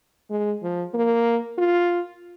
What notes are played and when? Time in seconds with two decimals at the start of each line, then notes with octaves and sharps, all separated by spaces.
0.30 G#3
0.63 F3
0.94 A#3
1.58 F4